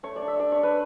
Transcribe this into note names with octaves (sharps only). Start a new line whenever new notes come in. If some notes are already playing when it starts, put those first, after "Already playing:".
A3 C#5
D5
D4
E5
D4 D5
C#5
D4
B4